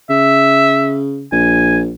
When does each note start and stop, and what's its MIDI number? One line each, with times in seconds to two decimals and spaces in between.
0.10 1.27 49
0.10 0.98 76
1.32 1.94 34
1.32 1.78 80